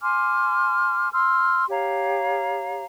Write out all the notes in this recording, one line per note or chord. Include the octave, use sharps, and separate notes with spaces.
G#5 C6 D6 F6
C6 E6 F6
G4 C#5 F5 A#5